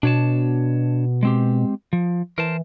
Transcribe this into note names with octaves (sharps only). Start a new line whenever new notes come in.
B2 D4 C#5 A5
G#3 C4 G4
F3
E3 A#4 C5 A5